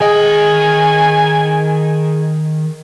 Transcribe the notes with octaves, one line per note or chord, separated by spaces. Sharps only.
D#3 G#4 D#5 G5 G#5